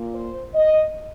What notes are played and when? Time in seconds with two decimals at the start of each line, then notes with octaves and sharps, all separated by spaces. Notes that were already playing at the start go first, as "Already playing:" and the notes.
Already playing: A#2 A#3
0.15 C5
0.54 D#5